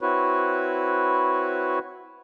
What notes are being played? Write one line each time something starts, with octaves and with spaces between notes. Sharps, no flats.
C4 E4 F#4 B4 C#5